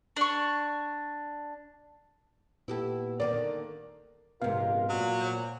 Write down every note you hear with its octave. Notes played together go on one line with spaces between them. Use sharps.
D4 C#6
A#2 B3 E4 G4 A4
D3 D#3 A#3 D5
A#1 G#2 C3 B3 F4 A#4 F5
A#2 F#3
C5 C#5